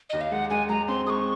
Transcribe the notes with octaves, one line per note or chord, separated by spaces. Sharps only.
D#2 D#5
F5
G#3 F#5
G#3 G#5
G#3 A#5
C4 C6
G#3 C#6 D#6